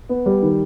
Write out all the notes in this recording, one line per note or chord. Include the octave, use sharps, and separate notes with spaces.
B3
G3
D#3